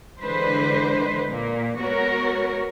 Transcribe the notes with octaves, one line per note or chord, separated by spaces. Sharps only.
D3 E3 G#3 B4 C5
A#2 A#3
G#3 B3 F#4 A#4 C#5